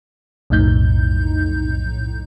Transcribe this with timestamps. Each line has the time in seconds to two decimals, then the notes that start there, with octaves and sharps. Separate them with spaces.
0.50 B1 F2 A2 D#4 G6